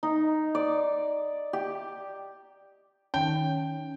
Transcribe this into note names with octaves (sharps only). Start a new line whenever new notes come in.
D#4
D5
G4
D#3 C#4 G5